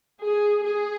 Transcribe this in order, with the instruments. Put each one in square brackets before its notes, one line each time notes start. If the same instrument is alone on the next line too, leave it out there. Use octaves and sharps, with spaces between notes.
[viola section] G#4
G#4